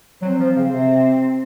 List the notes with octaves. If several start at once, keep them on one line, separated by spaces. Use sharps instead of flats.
F#3 C4
F3
C#3
C3 C4